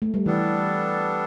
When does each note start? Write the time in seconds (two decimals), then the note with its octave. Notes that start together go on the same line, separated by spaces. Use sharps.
0.02 A3
0.14 G3
0.26 E3 G3 B3 D4 A4